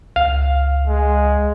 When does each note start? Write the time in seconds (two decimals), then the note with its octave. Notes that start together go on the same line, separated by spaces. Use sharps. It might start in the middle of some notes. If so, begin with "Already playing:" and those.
0.16 C#2 F5
0.88 G#3